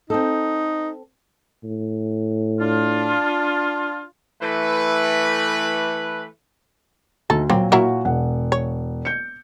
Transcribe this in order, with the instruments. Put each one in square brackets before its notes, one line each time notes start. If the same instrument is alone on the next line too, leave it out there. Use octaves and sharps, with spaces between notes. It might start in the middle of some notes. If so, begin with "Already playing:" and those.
[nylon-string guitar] C4 A4 [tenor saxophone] D#4
[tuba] A2
[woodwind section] D4 F4
[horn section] E3 A3 B4
[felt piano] D2 [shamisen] D#4 A4
[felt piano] A#2 F#3 [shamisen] A#3 C4
[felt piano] A#2 F#4 [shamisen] F#3 E4 A#4
[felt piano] E1 F#5
[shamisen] C#5
[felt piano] G6 C#7